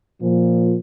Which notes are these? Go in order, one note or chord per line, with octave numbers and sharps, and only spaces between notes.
A#2 F3